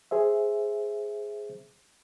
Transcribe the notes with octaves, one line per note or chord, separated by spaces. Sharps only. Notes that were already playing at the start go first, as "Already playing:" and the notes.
G#4 C5 E5